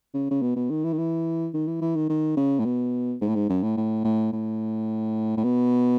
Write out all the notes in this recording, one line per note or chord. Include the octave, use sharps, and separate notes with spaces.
C#3
C#3
B2
B2
D#3
E3
D#3
E3
D#3
E3
E3
D#3
D#3
C#3
A2
B2
G#2
A2
G#2
F#2
A2
A2
A2
A2
A2
B2